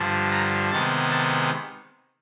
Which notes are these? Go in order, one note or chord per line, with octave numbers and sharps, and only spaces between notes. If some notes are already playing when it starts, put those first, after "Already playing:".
Already playing: G2 D3 F3
A#5
C3 D#3 G#3 B3 A5
A5